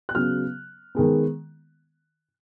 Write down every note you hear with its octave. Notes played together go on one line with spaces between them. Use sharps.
F#6
C#3 F#3 B3 F6
D#3 G#3 B3